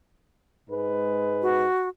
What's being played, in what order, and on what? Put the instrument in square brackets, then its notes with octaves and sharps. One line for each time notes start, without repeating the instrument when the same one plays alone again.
[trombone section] G#2 G#3 B4
[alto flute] F#4